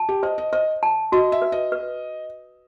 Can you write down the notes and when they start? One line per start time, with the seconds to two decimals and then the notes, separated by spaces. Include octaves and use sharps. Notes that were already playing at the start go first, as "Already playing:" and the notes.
Already playing: A5
0.09 G4
0.23 C5 D#5
0.38 D#5
0.53 C5 D#5
0.83 A5
1.12 F#4 D#5
1.32 E5
1.42 B4
1.52 D#5
1.72 B4